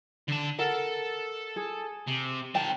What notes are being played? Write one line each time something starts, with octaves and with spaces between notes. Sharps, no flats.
D3 A5
A4 A#4 F#5
G#4
C3
D#3 G5 A5